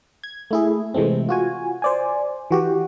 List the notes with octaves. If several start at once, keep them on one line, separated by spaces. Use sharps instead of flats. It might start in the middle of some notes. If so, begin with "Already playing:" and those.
G#6
A3 E4 G#4
C3 E3 G#3 A3 C4
F4 F#4 G#5
C5 D5 G#5
E3 F#4 G4